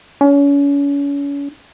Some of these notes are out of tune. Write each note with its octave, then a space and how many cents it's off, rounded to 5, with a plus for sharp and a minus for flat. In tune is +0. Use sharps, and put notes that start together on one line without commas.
C#4 +35